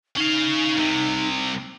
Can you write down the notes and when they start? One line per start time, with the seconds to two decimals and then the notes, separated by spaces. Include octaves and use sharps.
0.17 C#4 D#4 F5
0.78 C2 C3